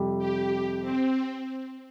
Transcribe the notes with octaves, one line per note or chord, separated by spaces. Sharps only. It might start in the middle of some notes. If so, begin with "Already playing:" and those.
Already playing: F2 C3 G3
G4
C4